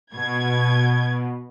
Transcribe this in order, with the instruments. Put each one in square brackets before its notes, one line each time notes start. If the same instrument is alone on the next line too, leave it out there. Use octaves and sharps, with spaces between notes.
[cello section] B2 [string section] G#6